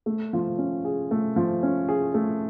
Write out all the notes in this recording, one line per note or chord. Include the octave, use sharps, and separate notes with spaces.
A3
F3
C#4
G#4
A3
F3
C#4
G#4
A3